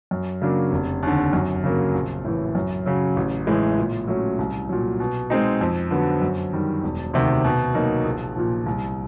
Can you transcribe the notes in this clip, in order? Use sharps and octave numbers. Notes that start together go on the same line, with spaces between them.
F#2
C#3 F#3 A#3 D4
F1
D#2 D3
F#2
C#3 F#3 A#3
A#1
A2 E3
F#2
C#3 F#3
A1
A2 E3 G#3
A#2
F#3 A3 C#4
C2
A#2 F#3
B2
G#3 C4 D#4
F2
D3 F#3 B3
F#2
D#3 G3
E1
D2 C3 D#3
B2
F#3 A#3 D#4
A#1
A#2 F3
C2